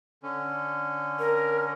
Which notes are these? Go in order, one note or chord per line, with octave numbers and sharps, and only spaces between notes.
D3 C#4
A#4